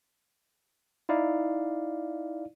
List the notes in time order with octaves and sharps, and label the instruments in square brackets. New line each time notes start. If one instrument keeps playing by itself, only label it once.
[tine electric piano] D#4 E4 D5 F5